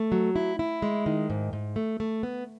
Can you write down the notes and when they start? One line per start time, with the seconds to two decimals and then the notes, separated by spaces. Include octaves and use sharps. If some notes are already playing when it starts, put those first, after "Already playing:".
Already playing: A3
0.12 F#3
0.36 E4
0.59 E4
0.82 G#3
1.06 D#3
1.30 G#2
1.53 G#2
1.76 A3
2.00 A3
2.23 B3